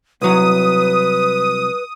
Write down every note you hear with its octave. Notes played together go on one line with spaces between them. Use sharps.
C2 F#3 B4 D#6